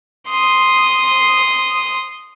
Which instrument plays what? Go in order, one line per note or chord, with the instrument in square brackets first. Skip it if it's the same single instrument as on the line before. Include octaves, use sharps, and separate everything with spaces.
[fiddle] C6 D#6